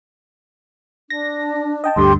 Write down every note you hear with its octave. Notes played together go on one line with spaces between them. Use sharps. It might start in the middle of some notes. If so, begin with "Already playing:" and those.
D4 A#6
D#5 G5 A5
D2 G2 D3 G4 C6